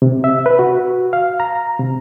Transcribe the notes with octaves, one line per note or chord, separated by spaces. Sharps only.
C3
E5
B4
F#4
F5
A#5
C3